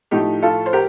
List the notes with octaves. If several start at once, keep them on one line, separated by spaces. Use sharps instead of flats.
A2 F3 A3 D#4 G4
F4 A4
C5
G4 A#4